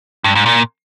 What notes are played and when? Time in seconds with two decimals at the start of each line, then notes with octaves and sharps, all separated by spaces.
0.24 G2
0.35 G#2
0.46 A#2